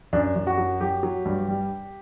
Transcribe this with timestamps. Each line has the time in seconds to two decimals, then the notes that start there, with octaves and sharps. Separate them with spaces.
0.13 F#2 D4
0.36 F#2
0.47 F#4
0.58 F#3
0.81 F#3 G4
1.03 F#3
1.25 G2
1.48 G3